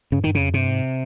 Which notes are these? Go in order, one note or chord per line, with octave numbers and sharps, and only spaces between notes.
G2 C#3
G2 D#3
F2 C#3
G2 C3
G#2